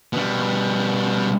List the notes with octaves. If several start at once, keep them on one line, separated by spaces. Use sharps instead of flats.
B2 G3